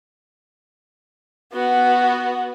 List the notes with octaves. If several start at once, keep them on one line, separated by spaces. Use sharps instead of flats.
B3 F#4